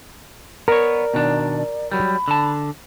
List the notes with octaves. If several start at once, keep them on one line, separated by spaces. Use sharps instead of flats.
B3 A#4 C#5 D5 A#5
B2 D#3 D4
F#3 G3 B5
D3 A5